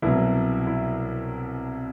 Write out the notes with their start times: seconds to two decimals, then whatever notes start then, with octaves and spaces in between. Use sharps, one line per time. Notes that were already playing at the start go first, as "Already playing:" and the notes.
0.02 C2 B2 F#3 E4
0.67 E4